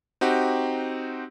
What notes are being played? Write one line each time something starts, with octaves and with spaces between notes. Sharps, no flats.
C4 D#4 F#4 G4